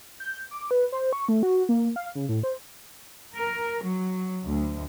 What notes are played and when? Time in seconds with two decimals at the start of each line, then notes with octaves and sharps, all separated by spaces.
0.20 G6
0.51 D6
0.71 B4
0.92 C5
1.13 C#6
1.29 A3
1.43 F#4
1.69 A#3
1.96 F5
2.15 C#3
2.29 A2
2.43 C5
3.36 A#4
3.83 F#3
4.44 D2